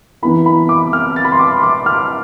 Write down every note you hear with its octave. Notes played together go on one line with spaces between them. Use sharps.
E3 B3 E4 B5
B5
D6
F6
A6
B5
C6
D6
D6
F6